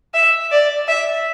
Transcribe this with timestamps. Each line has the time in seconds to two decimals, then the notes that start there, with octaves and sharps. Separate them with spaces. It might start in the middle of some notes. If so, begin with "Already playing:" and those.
0.14 E5
0.51 D5
0.88 E5